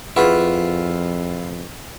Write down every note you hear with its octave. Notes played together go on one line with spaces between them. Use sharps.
F2 E4 F4 G#4 B4 F#5 C#6